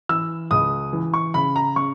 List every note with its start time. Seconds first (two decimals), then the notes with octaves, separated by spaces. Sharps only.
0.09 E3 E6
0.51 C#2 D#6
0.93 E3
1.14 C#6
1.34 C#3 B5
1.56 A#5
1.76 C#3 C#6